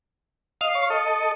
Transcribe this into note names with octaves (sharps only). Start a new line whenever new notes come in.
D#5 F5
C#5
A4 D#5 C#7